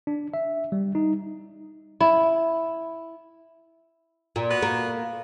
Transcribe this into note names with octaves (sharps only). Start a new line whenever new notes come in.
D4
E5
G3
D#4
E4
A#2
B3 F#4
A#3